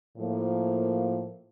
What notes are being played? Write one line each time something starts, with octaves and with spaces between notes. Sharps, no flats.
A2 F3 A#3